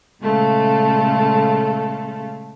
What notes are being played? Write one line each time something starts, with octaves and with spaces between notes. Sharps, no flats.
A#2 C#3 G#3 A3 A4 F5